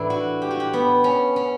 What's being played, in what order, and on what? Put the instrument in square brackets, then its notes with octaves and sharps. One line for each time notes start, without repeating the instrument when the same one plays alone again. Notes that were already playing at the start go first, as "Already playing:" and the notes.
Already playing: [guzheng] A2 E3 D4
F#4
G4
F#4
G4
B3
C#4
C#4